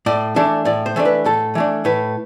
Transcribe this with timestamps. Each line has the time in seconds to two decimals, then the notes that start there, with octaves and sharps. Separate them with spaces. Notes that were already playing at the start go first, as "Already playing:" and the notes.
0.06 A2 D5
0.36 E3 A3 D4
0.65 A2 D5
0.86 C5
0.96 E3 A3 D4
1.05 B4
1.25 A2 A4
1.55 E3 A3 D4
1.85 A2 B4